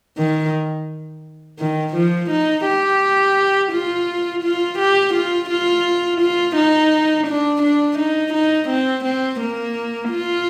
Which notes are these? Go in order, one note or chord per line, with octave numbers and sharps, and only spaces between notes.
D#3
D#3
F3
D#4
G4
F4
F4
G4
F4
F4
F4
D#4
D4
D4
D#4
D#4
C4
C4
A#3
F4